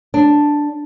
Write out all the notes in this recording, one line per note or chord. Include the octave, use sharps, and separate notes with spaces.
D4